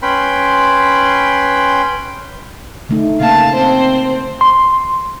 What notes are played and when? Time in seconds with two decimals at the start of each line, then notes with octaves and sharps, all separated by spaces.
0.02 C#4 B4 G5 B5 C6
2.89 D3 A3 D#4
3.20 C#3 A#3 F5 A5
3.55 C4 C5
4.41 C6